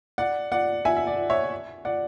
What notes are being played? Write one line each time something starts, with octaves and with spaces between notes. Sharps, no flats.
D5 F#5
D5 F#5
E5 G#5
E5
D5
C#5 E5
D5 F#5